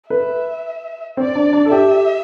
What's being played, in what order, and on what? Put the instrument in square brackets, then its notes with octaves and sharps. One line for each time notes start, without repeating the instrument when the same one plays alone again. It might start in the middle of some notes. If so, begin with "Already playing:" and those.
[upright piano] B4 [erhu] E5
[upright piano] C4 [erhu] D5
[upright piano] D4
D4
A4
[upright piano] G4 [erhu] E5